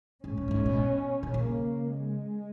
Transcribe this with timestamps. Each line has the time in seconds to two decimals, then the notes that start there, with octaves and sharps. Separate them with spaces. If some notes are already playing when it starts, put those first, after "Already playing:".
0.24 G#2 C#4
0.37 F#2
0.48 F#2
0.51 G#2
0.66 B2
1.23 B2
1.34 C#3 A#3
1.90 G#3